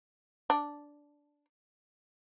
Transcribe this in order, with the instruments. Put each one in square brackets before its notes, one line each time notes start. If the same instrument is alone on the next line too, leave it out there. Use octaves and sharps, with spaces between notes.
[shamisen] D4